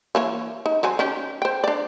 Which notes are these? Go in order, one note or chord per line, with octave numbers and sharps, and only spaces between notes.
E3 A#3 C#5
D#4
F#3 C4 G#5
C#4 D#4 G4
C5 G5
D4 D5